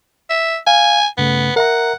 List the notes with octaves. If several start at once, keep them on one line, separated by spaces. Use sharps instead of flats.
E5
F5 G#5
G2 C#3 A3 B3
A#4 E5 F#5 A#5